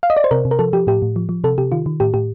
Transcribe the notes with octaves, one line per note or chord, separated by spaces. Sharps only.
F5
D#5
D5
C5
C3 A#4
C3
A#4
F3 A4
F3 G4
A2 G4
A2
F3
F3
C3 A4
C3 G4
D#3 F4
D#3
A2 G4
A2 G4